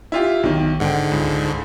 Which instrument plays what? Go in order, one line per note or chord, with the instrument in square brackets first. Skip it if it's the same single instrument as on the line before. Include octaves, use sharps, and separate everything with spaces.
[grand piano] E4 F4 G4
B1 D#3
[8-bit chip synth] G#2 D3 [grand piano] F#5 G5
[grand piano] C#2